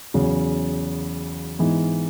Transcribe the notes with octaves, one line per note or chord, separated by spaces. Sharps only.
E2 C#3 F#3
G#2 E3 B3